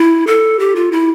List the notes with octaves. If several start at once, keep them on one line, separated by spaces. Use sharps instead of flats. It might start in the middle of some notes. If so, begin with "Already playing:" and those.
Already playing: E4
A4
G4
F4
E4